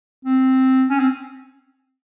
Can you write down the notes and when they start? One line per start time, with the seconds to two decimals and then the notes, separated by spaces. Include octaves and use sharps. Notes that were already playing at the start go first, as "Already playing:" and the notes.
0.25 C4
0.90 C#4
1.00 C4